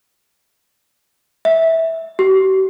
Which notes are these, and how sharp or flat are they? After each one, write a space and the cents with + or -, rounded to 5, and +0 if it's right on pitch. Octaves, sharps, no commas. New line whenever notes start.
E5 -15
G4 -45